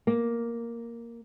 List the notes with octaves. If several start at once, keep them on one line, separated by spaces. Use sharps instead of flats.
A#3